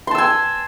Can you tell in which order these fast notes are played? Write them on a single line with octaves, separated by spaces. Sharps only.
C6 A5 E6 G#5